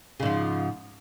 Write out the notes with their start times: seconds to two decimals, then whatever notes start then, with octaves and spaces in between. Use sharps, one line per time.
0.20 C#3
0.23 G#2
0.26 F3